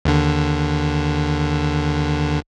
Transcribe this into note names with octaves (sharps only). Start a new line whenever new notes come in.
D#2 D3